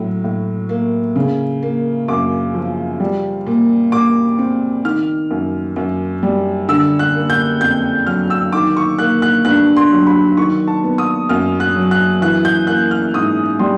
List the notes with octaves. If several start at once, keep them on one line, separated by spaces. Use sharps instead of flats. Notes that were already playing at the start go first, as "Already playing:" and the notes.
Already playing: A2 F#3
A2
A#3
C#3
A#3
F#2 D6
F3
G3
A#2
A#2 D6
C4
D#3 F6
F#2
F#2
G3
D3 E6
F#6
A#3
G6
F2 G6
F#3 F6
E6
D#3 D6
C#6
A#3 F#6
F#6
G2 F#6
C6
F#3
B5
D#3 C#6
A5
B3
D#6
F#2 F6
F#6
F#3
F#6
E3 F#6
G6
A#3 F#6
F6
G#2 D#6
G3 C6